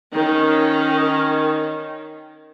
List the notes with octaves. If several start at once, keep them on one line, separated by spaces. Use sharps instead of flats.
D#3 C#4